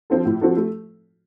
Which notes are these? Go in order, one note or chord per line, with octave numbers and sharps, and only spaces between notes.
F3 C4 F4 A4
A2
F3 C4 F#4 A4
A3